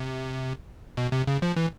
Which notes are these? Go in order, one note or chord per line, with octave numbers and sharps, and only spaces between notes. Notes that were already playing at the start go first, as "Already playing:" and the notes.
Already playing: C3
B2
C3
C#3
F3
E3